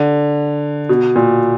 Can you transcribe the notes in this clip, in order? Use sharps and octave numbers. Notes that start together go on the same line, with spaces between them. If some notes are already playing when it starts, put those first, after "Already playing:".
Already playing: D3
B2
A#2